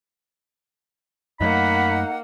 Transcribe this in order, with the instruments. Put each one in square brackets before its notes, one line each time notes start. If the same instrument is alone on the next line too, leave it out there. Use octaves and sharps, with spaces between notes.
[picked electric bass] F#2 F#3 A3 [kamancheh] A#3 [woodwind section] D#4 F#5 [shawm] B5